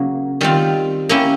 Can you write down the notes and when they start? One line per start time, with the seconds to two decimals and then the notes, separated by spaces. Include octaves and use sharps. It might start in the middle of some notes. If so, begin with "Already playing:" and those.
Already playing: C#3 F#3 A#3
0.41 D#3 G3 C4 F4
1.09 A#3 C#4 E4 G4